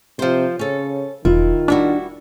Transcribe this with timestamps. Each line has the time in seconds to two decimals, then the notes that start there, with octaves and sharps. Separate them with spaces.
0.19 C3 F3 C5
0.59 C#3 C#4 A4
1.25 E1 D#3 E4 F4
1.68 G3 D4 E4 F#4